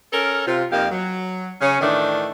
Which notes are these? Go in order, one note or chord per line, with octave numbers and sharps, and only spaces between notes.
C#4 A4 A#4
C3 F4
F2 A#3 D#4 G4 F5
F#3
C#3 C#4
A2 D#3 E3 A3 D4